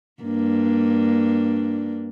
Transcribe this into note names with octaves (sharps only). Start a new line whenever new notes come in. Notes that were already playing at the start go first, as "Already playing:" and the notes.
G2 A#3 D4